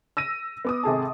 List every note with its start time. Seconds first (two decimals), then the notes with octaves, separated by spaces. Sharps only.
0.17 E6 A#6 D#7
0.65 B3 D6 D#6
0.83 G#1 C3 G#4 A4 A5